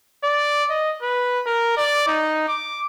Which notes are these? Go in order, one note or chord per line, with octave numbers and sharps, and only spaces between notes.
D5
D#5
B4
A#4
D5
D#4
D6